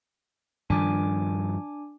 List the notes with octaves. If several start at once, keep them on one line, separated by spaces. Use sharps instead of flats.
G2 D#3 F3 D4 G#5 D6